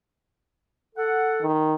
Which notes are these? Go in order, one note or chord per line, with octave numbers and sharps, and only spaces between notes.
A4 F#5
D#3